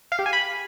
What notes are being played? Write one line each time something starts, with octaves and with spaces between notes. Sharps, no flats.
F5
G4
G#5
B5